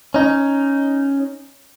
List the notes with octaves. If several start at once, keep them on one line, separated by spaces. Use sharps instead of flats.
C#4 D#4